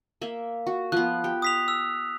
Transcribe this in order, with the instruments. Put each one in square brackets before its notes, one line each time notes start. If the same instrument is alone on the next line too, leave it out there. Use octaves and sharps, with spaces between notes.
[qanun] A#3 E5
F#4
[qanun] F3 B3 [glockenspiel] F#6
[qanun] G4
[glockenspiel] D#6 B6 F7
E6